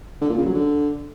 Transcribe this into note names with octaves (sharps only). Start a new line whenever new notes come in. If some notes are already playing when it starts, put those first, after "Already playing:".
D3
A#2
C#3
F#3
D3